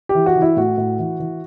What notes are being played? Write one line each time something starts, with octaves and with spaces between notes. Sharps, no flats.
G4
E3
F#4
E3
E4
A2 F#4
A2
E3
E3